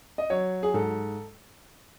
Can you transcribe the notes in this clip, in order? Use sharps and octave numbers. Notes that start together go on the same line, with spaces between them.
D#5
F#3 C#5
G#4
G#2 A4